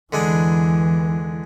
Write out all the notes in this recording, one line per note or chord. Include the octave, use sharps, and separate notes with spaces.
E2 D3 E3 G#3 D4